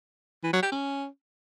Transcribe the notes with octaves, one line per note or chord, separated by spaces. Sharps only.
E3
F#3
G4
C#4